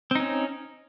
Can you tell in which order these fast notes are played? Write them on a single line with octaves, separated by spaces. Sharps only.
C4 D#4 C#4